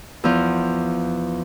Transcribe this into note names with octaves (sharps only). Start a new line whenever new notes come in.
E2 F3